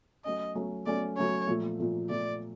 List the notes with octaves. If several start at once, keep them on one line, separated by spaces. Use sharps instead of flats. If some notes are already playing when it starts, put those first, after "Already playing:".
F#3 A3 C#4 D#5
F#3 A3 C#4
F#3 A3 C#4 D5
F#3 A3 C#4 C#5
A#2 F3 A3
A#2 F3 A3
A#2 F3 A3 D5